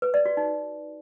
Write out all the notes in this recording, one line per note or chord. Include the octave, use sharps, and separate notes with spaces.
B4
D5
F#4
D#4